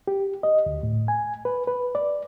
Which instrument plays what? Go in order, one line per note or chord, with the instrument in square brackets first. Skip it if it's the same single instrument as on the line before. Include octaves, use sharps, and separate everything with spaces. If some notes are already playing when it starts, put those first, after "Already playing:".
[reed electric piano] G4
D#5
D2
A2
G#5
B4
B4
D5